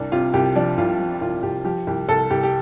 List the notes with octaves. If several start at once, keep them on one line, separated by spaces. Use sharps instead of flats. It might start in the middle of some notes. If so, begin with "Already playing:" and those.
Already playing: C2 D4
C3 F4
C2 G4
F3 D4
C2 F4
F3
C2 F4
C2 G4
F3 G4
C2 G4
C2 A4
C2 G4
G4